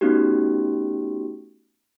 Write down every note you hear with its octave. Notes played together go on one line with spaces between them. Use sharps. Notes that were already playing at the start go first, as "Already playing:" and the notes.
A3 B3 C#4 D#4 F#4 G4